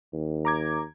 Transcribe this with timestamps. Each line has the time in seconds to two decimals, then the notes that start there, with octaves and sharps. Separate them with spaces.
0.13 D#2
0.45 A#5 D6 G#6